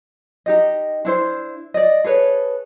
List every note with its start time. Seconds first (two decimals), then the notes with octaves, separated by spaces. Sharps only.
0.46 D#4 G4 D#5
1.05 D4 E4 C5
1.74 D5 D#5
2.04 G#4 A4 B4 C#5